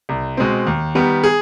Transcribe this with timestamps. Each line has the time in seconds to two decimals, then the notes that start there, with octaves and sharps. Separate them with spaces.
0.09 C2
0.37 B2 G#3 C4
0.67 D#2
0.95 D#3 G3 B3
1.24 G#4